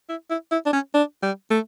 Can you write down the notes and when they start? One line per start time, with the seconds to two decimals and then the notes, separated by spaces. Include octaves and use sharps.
0.09 E4
0.30 E4
0.51 E4
0.65 D4
0.73 C#4
0.94 D4
1.23 G3
1.50 A3